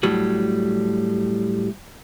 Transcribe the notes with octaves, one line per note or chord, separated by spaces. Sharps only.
A2 F#3 G3